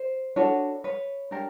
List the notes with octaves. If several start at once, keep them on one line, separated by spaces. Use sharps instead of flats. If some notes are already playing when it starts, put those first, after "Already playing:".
Already playing: C5
D4 F#4 A4 B4 C#5
B4 C#5
D4 G4 A#4